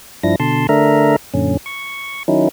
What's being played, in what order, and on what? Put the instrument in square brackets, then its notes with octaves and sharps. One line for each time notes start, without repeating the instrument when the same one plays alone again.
[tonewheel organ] G2 F3 D4 E4 A#6
B2 D3 A5 C6
D3 A3 D4 A#4 E5 A#5
F#2 A#2 D3 C#4
C#6
D#3 F#3 C#4 D#4 E4